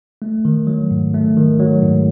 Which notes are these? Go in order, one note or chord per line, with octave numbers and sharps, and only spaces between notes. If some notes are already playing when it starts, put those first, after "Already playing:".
A3
D#3
F#3
G#2
A3
D#3
F#3
G#2